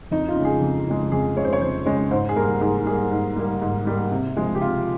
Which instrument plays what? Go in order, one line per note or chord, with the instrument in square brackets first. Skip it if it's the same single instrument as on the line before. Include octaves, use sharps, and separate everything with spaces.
[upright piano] F2 D#4
F4
C#3
G#3 G#4
F2
C#3 G#3
F2 G#4
C#3 G#3 C#5
C5
C#5
F2 C5
C#3 G#3 C#5
G#2 C5
G#4
G3 A#3 A#4
G#2 G#4
G3 A#3 G#4
G#2
G3 A#3
G#2
G3 A#3
C3
F3 G#3
G4
C3 F4